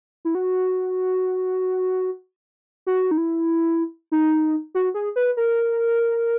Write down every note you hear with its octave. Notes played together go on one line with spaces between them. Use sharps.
E4
F#4
F#4
D#4
E4
D#4
F#4
G#4
B4
A#4